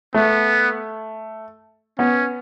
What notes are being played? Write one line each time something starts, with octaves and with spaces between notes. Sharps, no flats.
A3 B3
B3 C#4